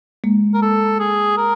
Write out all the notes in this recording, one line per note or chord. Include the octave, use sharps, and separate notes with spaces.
G#3 A#3
A#4
A4
G#4
A#4